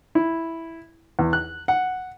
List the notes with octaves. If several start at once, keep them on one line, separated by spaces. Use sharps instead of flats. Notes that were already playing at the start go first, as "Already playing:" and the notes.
E4
E2
F#6
F#5